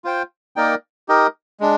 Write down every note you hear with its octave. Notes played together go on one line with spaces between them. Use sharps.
F4 C5 G5
A#3 D#4 A#4 D5 G5
D#4 G4 A#4 D#5
G#3 D4